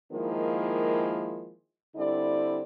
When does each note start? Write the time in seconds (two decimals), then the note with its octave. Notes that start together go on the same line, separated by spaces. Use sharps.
0.12 D#3 F3 G#3 A#3 E4
1.96 D3 G3 C4 E4 D5